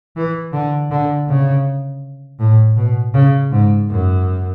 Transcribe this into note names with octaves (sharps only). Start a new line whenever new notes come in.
E3
D3
D3
C#3
A2
B2
C#3
G#2
F#2